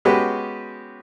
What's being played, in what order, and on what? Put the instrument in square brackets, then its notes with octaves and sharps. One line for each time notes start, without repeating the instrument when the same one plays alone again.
[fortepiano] G#3 B3 C#4 F#4 G4 B4